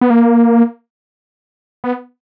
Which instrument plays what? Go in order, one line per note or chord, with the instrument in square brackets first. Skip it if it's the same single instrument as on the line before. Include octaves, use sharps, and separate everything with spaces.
[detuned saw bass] B3
A#3
B3